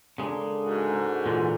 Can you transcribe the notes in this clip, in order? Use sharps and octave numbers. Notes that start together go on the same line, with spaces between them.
C#3 G#3 D4 A4 A#4
G#2 F#4
A#2 D3 E3 C6 D6